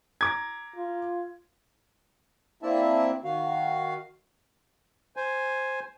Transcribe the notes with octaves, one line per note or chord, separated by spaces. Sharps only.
A#5 D6 G#6
F4
A#3 C4 D4 E4 E5 A5
D#3 F#4 F5
C5 G#5